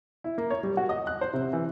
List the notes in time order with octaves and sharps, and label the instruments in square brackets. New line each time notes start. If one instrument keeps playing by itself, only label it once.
[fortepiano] E4
A#3
C#5
G3
F#4
D#5
F#6
C5
C3
E3